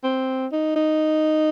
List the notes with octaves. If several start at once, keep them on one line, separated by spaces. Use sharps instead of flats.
C4
D#4
D#4